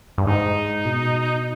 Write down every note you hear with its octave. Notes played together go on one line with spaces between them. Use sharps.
G2
G#2 D#4
B2